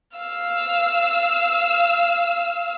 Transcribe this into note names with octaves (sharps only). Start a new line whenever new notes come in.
F5 E6